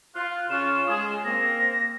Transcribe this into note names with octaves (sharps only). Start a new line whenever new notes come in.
F4 F#6
C#3 C#4 F4 E7
G#3 G#4
A#3 C4 A#6